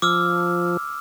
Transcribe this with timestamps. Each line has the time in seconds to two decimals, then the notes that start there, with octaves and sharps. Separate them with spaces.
0.02 F3 D6 E6 F6